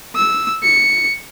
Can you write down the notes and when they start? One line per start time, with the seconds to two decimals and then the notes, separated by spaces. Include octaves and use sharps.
0.16 E6
0.63 C#7